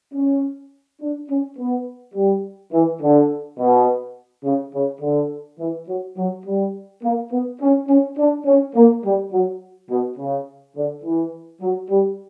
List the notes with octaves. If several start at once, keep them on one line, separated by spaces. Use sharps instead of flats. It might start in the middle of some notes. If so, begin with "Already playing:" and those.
C#4
D4
C#4
B3
G3
E3
D3
B2
C#3
C#3
D3
E3
F#3
F#3
G3
A#3
B3
C#4
C#4
D4
C#4
A#3
G3
F#3
B2
C#3
D3
E3
F#3
G3